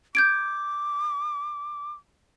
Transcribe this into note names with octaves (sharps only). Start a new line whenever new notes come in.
D6 G6 G#6 D7